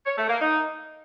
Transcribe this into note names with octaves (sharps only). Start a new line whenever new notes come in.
C#5
A3
A#3
D#4